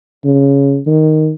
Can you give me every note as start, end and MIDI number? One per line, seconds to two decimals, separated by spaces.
0.25 0.79 49
0.87 1.32 51